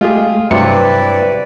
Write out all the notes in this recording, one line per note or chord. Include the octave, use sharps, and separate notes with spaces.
G#3 A3 F4 G4 G#4
G2 C3 F#3 E4 B4 D5 C#7